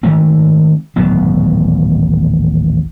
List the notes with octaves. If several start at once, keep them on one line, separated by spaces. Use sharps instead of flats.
D#3 G#3 A3 C4
D#1 A1 F#3 B3